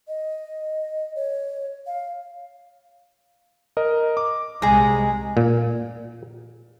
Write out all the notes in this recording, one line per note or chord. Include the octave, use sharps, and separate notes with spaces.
D#5
C#5
F5
A#4 D#5
D6
C2 G#3 G#4 A#5
A#2